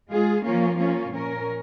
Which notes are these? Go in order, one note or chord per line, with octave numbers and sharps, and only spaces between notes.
G#3 F4 G#4
F3 A#3 C#4 F4
F3 A#3 C#4 F4
A#2 F3 C#4 A#4